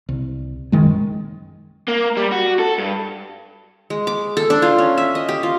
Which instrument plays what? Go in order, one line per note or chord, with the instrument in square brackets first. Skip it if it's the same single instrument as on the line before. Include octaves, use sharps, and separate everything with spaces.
[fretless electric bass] C2
A#1 F#2 D#3 G#3
[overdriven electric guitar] A#3
G3
F#4
A4
G2
[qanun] G#3
D6
A4
D4
F4
C#4
E5
D#5
G4
F4